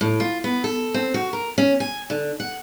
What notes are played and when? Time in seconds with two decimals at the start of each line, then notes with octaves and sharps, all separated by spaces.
0.01 A2
0.20 F4
0.44 B3
0.64 A4
0.94 C4
1.14 F#4
1.33 A#4
1.58 C#4
1.80 G#5
2.10 D3
2.40 F#5